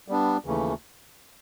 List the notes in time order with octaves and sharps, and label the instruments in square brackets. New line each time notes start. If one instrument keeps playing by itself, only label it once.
[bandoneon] G3 B3 D4
D#2 C#3 E3 A3